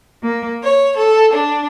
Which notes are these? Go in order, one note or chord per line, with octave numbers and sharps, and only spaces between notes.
A#3
C#5
A4
D4